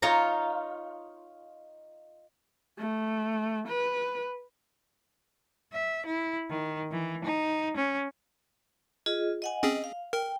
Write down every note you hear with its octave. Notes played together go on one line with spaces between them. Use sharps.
D#4 F4 C#5 A#5
A3
B4
E5
E4
D#3
E3
D#4
C#4
F4 G#4 D#5
D#5 F#5 G#5
C4 C#4 G#4 D#5
F5
A#4 G5